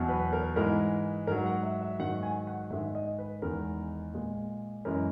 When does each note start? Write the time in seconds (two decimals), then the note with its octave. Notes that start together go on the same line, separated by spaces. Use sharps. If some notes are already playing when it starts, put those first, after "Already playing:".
Already playing: E2 B2 F#3
0.09 B4
0.33 A#4
0.56 G#2 E3 G#3 A#4
1.27 G#2 F#3 A#4
1.46 F#5
1.63 E5
1.81 E5
1.99 G#2 D#3 F#3 F#5
2.23 G#5
2.47 F#5
2.70 G#2 D#3 G#3 E5
2.95 D#5
3.19 B4
3.42 E2 D#3 G#3 A#4
4.13 A#2 G#3
4.85 F#2 E3 G#3 A#4